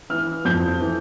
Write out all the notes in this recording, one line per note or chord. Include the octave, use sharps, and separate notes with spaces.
E3 F6
F2 G6
E3